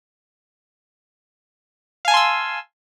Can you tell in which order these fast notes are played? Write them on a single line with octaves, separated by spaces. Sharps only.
F5 G#5 A5 C6 E6